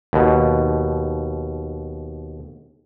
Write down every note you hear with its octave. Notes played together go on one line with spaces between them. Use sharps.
D#2 B2